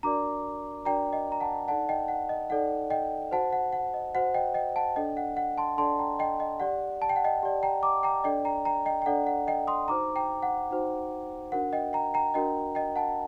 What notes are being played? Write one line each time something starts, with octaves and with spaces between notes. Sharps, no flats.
D4 F#4 A#4 D5 A#5 D6
D4 F#4 A#4 D5 G5 A#5
D#5 G5
A#5
F#5 A5
D#4 A4 D5 F#5 A5
D#5 G5
F#5
D#5
D#4 A4 D5 F#5
D#5 G5
F#4 C5 F#5 A5
F#5
F#5
D#5
F#4 C5 F#5
D#5 G5
D#5 G5
F#5 A5
D4 A4 D5 D#5 G5
F#5
F#5
A5 C6
D4 A4 D5 A5 C6
G5 A#5
D#5 G5
D#5 G5
G4 D5 F#5
A5
G5
F#5
D#5 G5
G4 D5
G5 A#5
A#5 D6
G5 A#5
D4 A4 D5 D#5 G5
G5 A#5
G5 A#5
D#5 G5
G5
D4 A4 D5 F#5
F#5
D#5 G5
C6 D#6
D#4 F#4 C5 A#5 D6
G5 A#5
F#5
D#4 F#4 C5
D4 F#4 A#4 F#5
D#5 G5
G5 A#5
G5 A#5
D4 F#4 A#4 D#5 G5
D#5 G5
F#5 A5